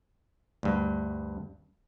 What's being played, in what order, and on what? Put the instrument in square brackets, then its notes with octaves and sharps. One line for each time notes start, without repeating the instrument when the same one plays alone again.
[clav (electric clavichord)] D2 G2